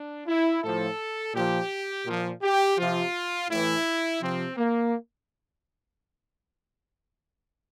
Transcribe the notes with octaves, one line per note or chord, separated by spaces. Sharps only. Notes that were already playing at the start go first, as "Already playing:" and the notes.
Already playing: D4
E4
A2 F3 A4
A#2 F3 G4
A#2 F3
G4
C3 F3 F4
A2 E3 E4
C3 F3 C4
A#3